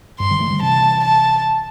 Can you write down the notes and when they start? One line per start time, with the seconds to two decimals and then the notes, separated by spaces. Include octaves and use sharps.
0.20 G2 C6
0.30 D3 G3
0.40 E3 A3
0.51 D3 G3
0.62 C3 E3 A5
1.04 A5